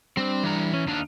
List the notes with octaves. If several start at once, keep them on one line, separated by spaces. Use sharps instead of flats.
G3 C4 D4
E3 A#5
C#4
D#2 D4 D#4 F5